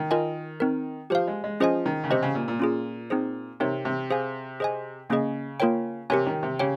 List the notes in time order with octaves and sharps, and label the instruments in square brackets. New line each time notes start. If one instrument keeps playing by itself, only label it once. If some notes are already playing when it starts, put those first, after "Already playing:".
Already playing: [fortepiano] D#3
[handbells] F4 A#4 D#5 G#5
C4 D#4 A#4
[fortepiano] F3 [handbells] G4 C5 F5
[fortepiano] G#3
G#3
[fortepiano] F3 [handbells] C#4 G#4 C5 D#5 G#5
[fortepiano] D#3
C#3
[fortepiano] C3 [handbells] G4 C5 D#5
[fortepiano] C#3
A#2
A#2
[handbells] C#4 F4 G#4
C4 D#4 G#4 C5
[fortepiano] C3 [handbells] C4 D#4 A#4 C#5
[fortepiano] C3
[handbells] G#4 C5 F5 G#5
G#4 C5 D#5 G#5
[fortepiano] C#3 [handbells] A#3 C#4 G#4 D#5
[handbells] A#3 F4 A#4 C#5 G5
[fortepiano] C3 [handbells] G4 A#4 C#5 G#5
[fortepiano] D#3
C3
[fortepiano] C#3 [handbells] G4 C#5 G5